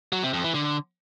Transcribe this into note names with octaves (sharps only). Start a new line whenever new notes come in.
F#3
C3
F2
E3
D3